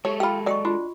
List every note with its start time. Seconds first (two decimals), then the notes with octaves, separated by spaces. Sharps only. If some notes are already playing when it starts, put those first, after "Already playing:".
0.05 G#3 G4 A4 C#5
0.20 F4 G4 B5 E6
0.46 F#3 D5 D#5 G5 C#6
0.65 D4 F4 F#4